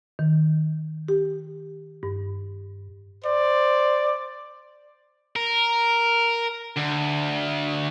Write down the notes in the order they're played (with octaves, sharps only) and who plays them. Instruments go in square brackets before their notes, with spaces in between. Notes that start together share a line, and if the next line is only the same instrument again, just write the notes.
[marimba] D#3
G4
G2
[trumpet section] C5 D5
[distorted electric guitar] A#4
D2